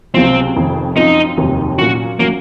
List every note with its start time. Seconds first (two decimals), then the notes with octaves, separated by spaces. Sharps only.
0.14 C#2 C3 F#3 C4 C#4 F4
0.56 F1 F2 D#3
0.96 F#2 F3 C4 D#4 F4
1.37 F1 D#2 D#3 F#3 C4
1.78 A#2 F#3 C#4 F#4
2.19 F#3 A#3 C#4 F#4